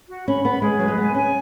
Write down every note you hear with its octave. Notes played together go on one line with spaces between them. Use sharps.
F#4
C#4 B5
B3 B5
G#3 G#4
F#3 B4
G#3
B3 G#5
C#4 G#5